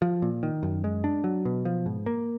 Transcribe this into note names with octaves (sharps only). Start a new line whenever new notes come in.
F3
A#2
D#3
F#2
G#3
D4
F#3
B2
F3
G#2
A#3